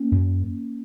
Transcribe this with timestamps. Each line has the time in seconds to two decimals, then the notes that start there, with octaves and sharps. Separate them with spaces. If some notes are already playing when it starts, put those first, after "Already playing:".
Already playing: A#3 C#4
0.12 F#2